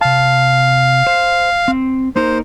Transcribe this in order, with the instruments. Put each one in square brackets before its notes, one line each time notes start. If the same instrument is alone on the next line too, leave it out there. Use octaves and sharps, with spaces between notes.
[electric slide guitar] C3 A5 [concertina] F5
[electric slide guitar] C5
C4
[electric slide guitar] A#3 D#4 A#4 [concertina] C5